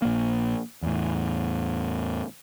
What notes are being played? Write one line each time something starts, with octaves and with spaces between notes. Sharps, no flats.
A#1 A#3
E2 A2